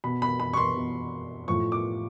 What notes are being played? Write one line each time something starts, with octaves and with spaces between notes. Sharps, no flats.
B2 B5
B5
B5
C#6
C6
B2
A2 F3 C#6
D6